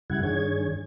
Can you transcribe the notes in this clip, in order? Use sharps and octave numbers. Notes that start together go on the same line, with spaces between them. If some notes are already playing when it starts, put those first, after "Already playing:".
F#2 C#3 G3 E4 F#5 G#6
G2 D#3 D4 G#4 C#5 G#6